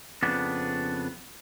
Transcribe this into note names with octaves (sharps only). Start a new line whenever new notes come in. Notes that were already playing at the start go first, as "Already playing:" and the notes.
F2 C#3 B3 D4